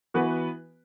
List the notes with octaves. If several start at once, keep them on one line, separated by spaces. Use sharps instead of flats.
E3 B3 F#4 B4